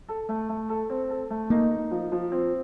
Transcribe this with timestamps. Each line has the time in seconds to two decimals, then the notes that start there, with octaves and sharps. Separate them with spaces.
0.08 A4
0.29 A3
0.49 A3
0.69 A4
0.90 C4
1.10 A4
1.30 A3
1.50 A#3 D#4
1.71 D#4
1.91 F3
2.12 F3
2.32 C4